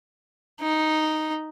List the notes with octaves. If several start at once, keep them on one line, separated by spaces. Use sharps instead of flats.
D#4